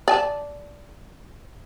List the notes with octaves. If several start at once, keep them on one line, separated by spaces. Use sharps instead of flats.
D5 G#5 A5